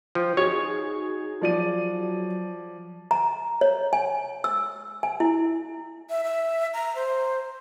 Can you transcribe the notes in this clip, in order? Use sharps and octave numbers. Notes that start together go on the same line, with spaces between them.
F3 G5
D#4 F#4 G#4 C#5 G#6
F3 F#3 D5 D#7
A#5
C#5
G#5
E6
G#5
E4
E5
E5
A#5
C5